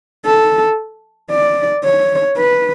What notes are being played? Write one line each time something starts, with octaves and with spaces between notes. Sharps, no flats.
A4
D5
C#5
B4